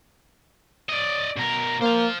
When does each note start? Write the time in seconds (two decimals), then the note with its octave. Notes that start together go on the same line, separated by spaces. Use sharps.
0.89 D5 D#5
1.37 B2 A#4
1.81 A#3 C5 F5